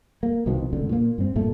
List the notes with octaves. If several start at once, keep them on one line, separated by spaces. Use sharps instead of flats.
A#3
C2 B2 D#3 F3
F1 C#2 D3
A#2 A#3
G2 C4
G2 A#2 A3